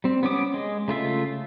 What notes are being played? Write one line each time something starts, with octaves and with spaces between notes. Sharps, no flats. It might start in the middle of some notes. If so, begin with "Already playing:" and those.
G3 C4
B3 C#4 D6 D#6
G#3
C#3 A3 F4 E5